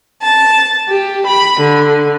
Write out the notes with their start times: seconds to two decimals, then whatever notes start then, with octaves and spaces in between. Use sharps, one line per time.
0.22 A5
0.88 G4
1.26 B5
1.59 D3